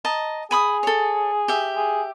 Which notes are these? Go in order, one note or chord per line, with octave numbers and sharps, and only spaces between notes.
D#5 A5 A#5
G#4 G#5 B5 D#6
A4 C#5
G4 E5
G#4